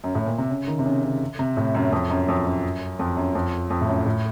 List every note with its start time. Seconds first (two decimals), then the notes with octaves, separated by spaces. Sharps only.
0.04 F#2
0.15 A2
0.26 A#2
0.38 C3
0.50 C#3
0.68 D#3
0.79 C3
0.86 C#3
1.04 C#3
1.39 C3
1.57 A2
1.75 F#2
1.92 F2
2.10 F#2
2.28 F2
2.46 F#2
2.99 F2
3.17 F#2
3.35 F2
3.70 F2
3.81 A2
3.88 F#2
4.06 A2